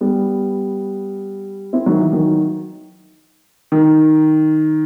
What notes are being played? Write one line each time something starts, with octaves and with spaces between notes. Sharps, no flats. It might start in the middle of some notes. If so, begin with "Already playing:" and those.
G3 B3
C4 E4
D#3 F#3
E3
D#3 F#3
D#3